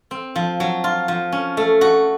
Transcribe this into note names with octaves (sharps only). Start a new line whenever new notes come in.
C4
F3
F#3
F4
F3
C#4
A3
F#4